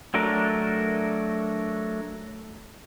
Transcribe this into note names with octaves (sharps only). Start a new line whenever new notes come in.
F#3 A3 D4 A#4